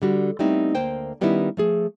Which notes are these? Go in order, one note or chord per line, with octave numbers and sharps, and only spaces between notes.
D3 G3 F#4
G3 A3 B3 C4 D#4 E4
D2 A#3 C5 G5
D#3 G3 B3 C#4 D#4 E4
F3 A3 G#4